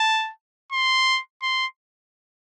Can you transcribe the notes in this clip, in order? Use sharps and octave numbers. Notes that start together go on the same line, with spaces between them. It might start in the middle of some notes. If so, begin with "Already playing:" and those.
Already playing: A5
C6
C6